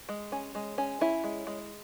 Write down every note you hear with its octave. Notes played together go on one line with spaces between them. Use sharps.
G#3
C#4
G#3
C#4
C#4 E4
G#3
G#3